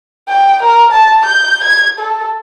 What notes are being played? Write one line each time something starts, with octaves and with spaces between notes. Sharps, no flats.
G5
A#4
A5
G6
G#6
A4